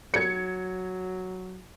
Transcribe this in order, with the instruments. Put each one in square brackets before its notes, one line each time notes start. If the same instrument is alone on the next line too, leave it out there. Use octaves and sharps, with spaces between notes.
[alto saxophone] F#3 [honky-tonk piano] G#6 C#7